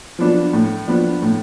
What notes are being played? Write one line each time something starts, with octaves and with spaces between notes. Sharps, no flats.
F3 B3 D4
A2
F3 B3 D4
A2